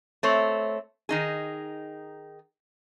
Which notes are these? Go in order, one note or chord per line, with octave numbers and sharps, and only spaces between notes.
A3 C4 C#5
D#3 D#4 G#4